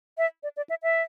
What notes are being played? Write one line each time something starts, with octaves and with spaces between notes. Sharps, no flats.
E5
D5
D5
E5
E5